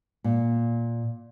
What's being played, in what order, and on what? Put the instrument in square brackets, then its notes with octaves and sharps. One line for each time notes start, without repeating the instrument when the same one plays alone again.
[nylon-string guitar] A#2